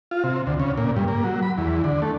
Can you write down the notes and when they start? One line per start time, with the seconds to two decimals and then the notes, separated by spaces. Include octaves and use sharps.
0.11 F4
0.24 C3
0.47 D2
0.60 C#3
0.78 A#2
0.96 G2
1.08 A#3
1.24 F#3
1.43 B5
1.58 E2
1.84 D3
2.02 A3